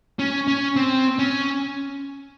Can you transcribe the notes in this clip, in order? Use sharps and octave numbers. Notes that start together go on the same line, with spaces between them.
C#4
C#4
C4
C#4